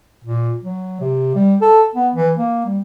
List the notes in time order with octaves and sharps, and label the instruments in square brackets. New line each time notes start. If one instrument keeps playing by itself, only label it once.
[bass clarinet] A#2
F#3
C3
G3
A4
B3
E3
A#3
G3